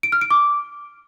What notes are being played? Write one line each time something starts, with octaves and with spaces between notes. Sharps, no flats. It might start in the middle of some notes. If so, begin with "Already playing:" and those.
D7
F6
D7
D6